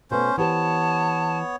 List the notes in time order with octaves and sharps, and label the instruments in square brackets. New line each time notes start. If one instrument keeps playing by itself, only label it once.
[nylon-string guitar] B2 A3 B3 [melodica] C#4 C5
[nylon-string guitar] E3 G4 C5 [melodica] B3 C#5 [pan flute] A5